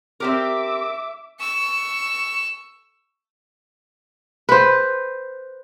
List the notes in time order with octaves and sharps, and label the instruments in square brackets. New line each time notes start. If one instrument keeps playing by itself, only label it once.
[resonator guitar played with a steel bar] C4 G4 A#4 [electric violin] E5 D6
[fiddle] C#6 E6
[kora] B4 C5